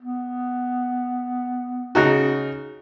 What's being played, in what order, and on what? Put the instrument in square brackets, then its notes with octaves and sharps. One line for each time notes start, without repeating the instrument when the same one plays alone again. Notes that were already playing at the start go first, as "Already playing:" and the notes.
[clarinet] B3
[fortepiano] C#3 D#4 F#4